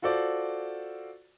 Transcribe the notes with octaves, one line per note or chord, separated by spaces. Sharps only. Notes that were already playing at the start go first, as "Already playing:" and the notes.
F4 F#4 A4 C5 D5